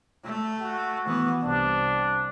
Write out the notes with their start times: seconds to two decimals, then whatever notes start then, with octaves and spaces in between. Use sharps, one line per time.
0.24 A3
0.61 F#4
1.07 E3 B3
1.43 C2 D4